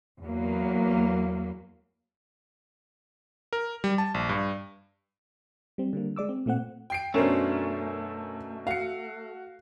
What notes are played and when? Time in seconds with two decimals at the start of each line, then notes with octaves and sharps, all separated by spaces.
0.21 E2 F#3 A#3
3.53 A#4
3.84 G3
3.98 A5
4.14 A#1
4.29 G2
5.78 G3 C4
5.93 D3 G3 A#3
6.16 G#3 D5 D6 E6
6.29 C4
6.46 A#2 A3 C4 F#5
6.90 G5 C7 D7
7.14 F#2 B2 A3 C#4 D4 A#4 C5
8.67 F#4 F5 C#7